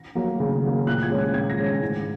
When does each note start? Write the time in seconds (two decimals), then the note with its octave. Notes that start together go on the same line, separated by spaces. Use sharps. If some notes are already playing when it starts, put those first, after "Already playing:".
Already playing: A#6
0.15 F#3 A#3
0.40 C#3
0.63 F#3 A#3
0.86 A#2 F#6
1.03 G#6
1.11 G#3 C#4
1.19 F#6
1.34 A#2 G#6
1.50 A#6
1.58 G#3 C#4
1.66 G#6
1.82 G#2